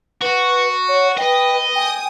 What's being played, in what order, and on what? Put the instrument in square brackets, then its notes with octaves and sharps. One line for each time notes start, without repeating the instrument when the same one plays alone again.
[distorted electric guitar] F#4 [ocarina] B4
[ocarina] C#5
[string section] B4 [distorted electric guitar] D#5 [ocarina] G5
[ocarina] G5 [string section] G#5 D#6